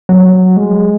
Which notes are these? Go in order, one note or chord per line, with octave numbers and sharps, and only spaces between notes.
F#3
G#3